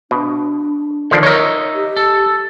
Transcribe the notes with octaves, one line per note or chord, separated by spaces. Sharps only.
B2 D4
D3 D#3 F3 D4
D#4 A#4 C#5 D#5 E5
G4
A4